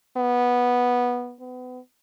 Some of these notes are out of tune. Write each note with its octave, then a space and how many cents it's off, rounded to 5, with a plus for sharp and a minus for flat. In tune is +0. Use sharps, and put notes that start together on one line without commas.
B3 -10
B3 +35